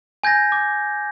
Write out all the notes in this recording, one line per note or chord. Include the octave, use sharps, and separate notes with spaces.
G#5 G6 G#6 A#6
D6